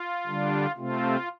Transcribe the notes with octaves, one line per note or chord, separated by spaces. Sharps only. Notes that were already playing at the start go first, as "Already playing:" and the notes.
Already playing: F4
D3 G3 D4
C3 A3 C4 F4